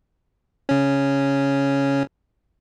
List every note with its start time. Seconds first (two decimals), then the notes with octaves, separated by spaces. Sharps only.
0.69 C#3 C#4